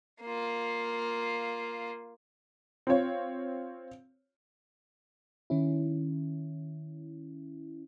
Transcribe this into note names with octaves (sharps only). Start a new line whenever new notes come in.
A#3 F4
C4 F4 C#5
D#3 C#4 E4